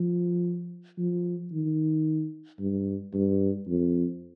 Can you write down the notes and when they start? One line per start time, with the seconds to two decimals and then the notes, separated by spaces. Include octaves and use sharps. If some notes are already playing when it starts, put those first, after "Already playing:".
Already playing: F3
0.98 F3
1.52 D#3
2.59 G2
3.13 G2
3.67 F2